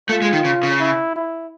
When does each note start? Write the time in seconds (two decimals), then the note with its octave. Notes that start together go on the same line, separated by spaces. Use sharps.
0.09 A3 F4
0.22 G#3
0.33 D#3
0.45 C#3
0.63 C#3
0.80 E4
1.16 E4